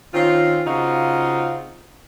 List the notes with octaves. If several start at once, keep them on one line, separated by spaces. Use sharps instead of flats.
D#3 C4 C#4 F4
C#3 C4 D#4 F4 F#4